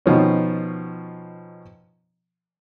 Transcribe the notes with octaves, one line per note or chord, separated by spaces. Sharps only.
B2 D#3 F3 C#4